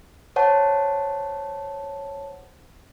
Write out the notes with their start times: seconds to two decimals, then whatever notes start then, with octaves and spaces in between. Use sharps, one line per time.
0.36 C5 C#5 F#5 A5